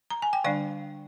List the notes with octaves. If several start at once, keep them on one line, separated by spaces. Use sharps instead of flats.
A#5
G#5
G5
D3 G3 D4 D5 F5